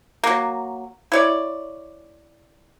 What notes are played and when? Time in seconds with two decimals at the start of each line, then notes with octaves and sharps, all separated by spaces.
0.23 F#3 A#3
1.12 E4 C#5 D5